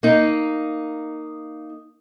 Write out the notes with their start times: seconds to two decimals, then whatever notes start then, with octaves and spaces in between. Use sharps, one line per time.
0.03 A#3 D#4